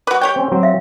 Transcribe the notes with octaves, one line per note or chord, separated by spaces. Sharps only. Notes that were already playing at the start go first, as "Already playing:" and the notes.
F#4 B4 D6
G4 C#5 G5
C4 C#4
F#3 C4
E5 F5